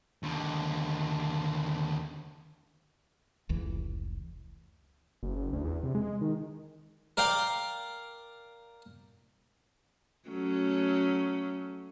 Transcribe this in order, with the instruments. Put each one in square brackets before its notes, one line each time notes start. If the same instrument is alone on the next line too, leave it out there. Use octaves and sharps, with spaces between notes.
[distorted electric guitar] D#2 D3
[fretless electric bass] F1 C#2 E3
[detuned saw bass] F#1
F#1
D2
E2
C3
G#3
D#3
[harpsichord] A#4 D5 F5 G5
[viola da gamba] F#3 A3 C#4